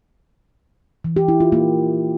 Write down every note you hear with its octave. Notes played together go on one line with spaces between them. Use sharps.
E3
G4
E4
F4
A#3